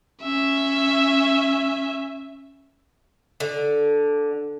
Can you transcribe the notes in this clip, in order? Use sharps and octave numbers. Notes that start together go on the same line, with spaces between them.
C#4 E5
D3